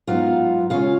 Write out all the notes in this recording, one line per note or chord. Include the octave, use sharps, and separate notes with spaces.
G#2 F#3 B3 D#4 F4 F5
C#3 G#3 C#4 F4 F5